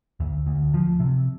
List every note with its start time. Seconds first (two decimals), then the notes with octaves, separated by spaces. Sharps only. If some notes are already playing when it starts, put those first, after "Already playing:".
0.20 D2
0.46 D2
0.74 F3
1.00 C3